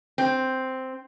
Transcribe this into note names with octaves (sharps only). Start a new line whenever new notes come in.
C4